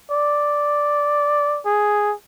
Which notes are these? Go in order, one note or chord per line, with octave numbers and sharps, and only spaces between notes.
D5
G#4